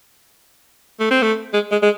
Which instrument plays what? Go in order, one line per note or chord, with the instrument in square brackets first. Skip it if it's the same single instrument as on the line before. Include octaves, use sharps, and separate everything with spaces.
[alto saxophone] A3
C4
A3
G#3
G#3
G#3